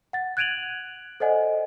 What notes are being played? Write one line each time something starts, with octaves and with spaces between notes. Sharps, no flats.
F#5 A6
F#6 G#6 D7 D#7 F7 F#7
A4 C5 D5 D#5 F#5 G#5